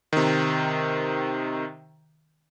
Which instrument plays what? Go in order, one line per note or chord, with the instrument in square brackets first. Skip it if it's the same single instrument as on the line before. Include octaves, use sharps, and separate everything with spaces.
[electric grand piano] C3 D#3